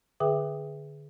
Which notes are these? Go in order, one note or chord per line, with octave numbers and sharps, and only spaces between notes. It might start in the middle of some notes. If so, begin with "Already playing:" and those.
D3 G#4 B4 E5 G5 D#6